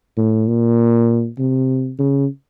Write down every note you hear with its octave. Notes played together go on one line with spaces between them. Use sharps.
A2
A#2
C3
C#3